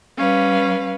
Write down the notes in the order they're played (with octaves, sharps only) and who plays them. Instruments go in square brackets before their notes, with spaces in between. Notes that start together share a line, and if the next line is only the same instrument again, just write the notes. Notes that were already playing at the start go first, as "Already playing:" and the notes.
[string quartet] G3 C#4 B4 F5